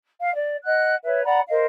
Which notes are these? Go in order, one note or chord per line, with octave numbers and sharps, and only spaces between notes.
F5
D5
D#5 F#5 F#6
B4 C#5 E5
D5 F#5 A#5 B5
A#4 C5 D#5 F5